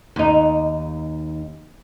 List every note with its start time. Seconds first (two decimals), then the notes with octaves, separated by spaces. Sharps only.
0.16 D#2 D#4